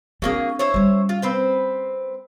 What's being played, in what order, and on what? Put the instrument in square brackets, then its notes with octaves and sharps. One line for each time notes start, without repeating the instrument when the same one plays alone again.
[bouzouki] F#3 A#3 G#4 [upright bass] C4 D4
[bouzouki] E4 C5 C#5
[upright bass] G3 C#4
[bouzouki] F4
C4 B4 C5